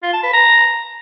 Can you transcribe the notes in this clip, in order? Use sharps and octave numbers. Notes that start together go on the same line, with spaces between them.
F4
A5
B4
A#5